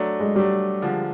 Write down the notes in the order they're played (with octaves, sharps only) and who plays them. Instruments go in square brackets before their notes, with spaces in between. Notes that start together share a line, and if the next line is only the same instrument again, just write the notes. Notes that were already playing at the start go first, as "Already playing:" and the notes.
Already playing: [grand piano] F#3 A3 D4
[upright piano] G#3
[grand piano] F#3 A3 D4 [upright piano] G3
[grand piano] D3 F3 G#3